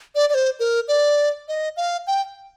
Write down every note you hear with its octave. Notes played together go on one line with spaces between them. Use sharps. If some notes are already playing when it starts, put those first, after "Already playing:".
D5
D5
C5
A#4
D5
D#5
F5
G5